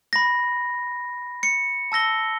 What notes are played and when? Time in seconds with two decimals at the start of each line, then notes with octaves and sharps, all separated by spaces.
0.13 B5 A#6
1.43 C#7
1.92 A5 E6 A#6 G7